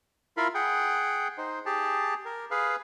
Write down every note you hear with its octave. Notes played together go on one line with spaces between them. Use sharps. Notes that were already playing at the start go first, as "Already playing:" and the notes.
E4 F4 A#4 F5 B5
G#4 F#5 G5
D#4 C5
G4 G#4 A5
A#4
G#4 B4 F5